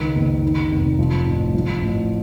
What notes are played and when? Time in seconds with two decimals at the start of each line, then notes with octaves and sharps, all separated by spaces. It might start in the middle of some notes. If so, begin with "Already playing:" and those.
Already playing: C#2 D#3
0.15 F#1
0.43 D#3
0.71 F1
0.99 F3
1.26 A1
1.54 F3
1.82 A1